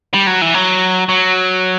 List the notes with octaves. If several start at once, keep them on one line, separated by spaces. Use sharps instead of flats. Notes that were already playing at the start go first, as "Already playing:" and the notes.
G3
F#3
E3
F#3
F#3